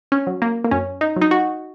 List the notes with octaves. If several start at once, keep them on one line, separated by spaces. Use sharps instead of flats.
C#4
F#3
A#3
A#3
F#2 C#4
D#4
F#3
D#4
F#4